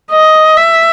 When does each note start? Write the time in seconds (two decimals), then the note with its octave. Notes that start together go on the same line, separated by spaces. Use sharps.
0.11 D#5
0.57 E5